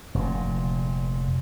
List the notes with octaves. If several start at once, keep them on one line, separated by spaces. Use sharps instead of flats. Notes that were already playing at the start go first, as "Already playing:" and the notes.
F1 A#2